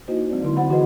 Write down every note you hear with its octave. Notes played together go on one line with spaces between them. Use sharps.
A#3 D#4 E4 F#4 C5 D#5
F#3 G#3 C4 D5
D3 E4 C6
C4 F#4 C5 F#5 B5
E3 F#4 G#4 B4 C5 D#5